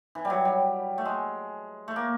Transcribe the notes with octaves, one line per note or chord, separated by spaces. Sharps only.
E3
G3
F#3
G3
A3
G#3
A3
A#3